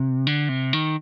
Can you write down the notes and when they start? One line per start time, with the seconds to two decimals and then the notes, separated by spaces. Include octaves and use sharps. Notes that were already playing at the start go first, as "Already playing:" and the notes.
Already playing: C3
0.27 D3
0.49 C3
0.73 D#3